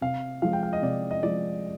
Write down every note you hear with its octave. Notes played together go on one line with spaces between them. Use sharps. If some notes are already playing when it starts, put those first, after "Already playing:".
C3 F5
F3 G#3 F5
G5
F5
D#5
C3 D5
D#5
F3 G#3 D5